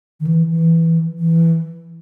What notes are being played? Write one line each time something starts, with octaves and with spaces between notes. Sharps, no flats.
D#3
E3
E3
E3